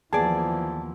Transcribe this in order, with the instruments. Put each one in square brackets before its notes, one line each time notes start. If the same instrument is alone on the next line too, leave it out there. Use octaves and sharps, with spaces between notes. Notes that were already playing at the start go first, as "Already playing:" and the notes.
[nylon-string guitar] D#2 B3 [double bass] E3 F3 [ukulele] G#4 D5 [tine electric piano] A5